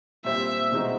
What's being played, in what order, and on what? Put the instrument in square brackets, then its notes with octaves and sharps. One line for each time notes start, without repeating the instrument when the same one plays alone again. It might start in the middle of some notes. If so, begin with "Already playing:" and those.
[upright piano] A#2 G3 C4 [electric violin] E5
[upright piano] B2 G#3 C4 D#4 F#4